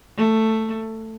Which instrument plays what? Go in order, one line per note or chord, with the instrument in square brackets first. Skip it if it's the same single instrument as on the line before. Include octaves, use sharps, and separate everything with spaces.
[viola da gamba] A3